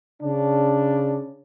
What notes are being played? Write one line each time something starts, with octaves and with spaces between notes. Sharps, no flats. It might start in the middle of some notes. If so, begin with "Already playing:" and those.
C#3 D4